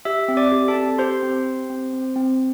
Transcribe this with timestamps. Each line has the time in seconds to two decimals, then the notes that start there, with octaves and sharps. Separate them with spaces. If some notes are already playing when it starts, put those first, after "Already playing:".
0.05 G4 E5 E6
0.28 C4
0.37 D5 D6
0.52 G4
0.68 A4 A5
0.76 C4
0.98 G4 C5 C6
1.22 C4
1.46 G4
1.70 C4
1.93 C4
2.16 C4